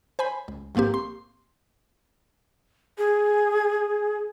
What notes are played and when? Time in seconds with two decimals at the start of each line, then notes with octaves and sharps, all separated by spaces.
0.19 C5 G#5 B5
0.48 C#2
0.75 A#1 G#2 A#3 C4 G4
0.94 C6
2.98 G#4